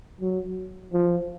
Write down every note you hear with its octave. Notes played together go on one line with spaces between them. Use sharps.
F#3
F3